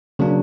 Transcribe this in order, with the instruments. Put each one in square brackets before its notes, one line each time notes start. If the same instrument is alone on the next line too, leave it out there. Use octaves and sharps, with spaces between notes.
[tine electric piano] C#3 F#3 A#3 D4